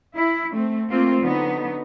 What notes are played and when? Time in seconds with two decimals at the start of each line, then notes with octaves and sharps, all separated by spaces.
0.16 E4
0.52 A3 C4
0.90 A3 A#3 C4 F4
1.22 D3 F#3 B3 D#4